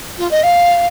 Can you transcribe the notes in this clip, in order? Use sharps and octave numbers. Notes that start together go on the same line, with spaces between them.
F4
D#5
F5